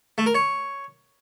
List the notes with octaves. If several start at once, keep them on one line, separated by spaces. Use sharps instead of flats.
A3
A#4
C#5